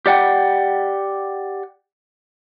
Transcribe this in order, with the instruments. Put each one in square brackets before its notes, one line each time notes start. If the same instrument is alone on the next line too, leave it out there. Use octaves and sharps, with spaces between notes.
[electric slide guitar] G4 D5 F#5 G5